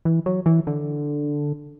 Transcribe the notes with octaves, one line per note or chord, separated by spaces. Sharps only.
E3
F#3
E3
D3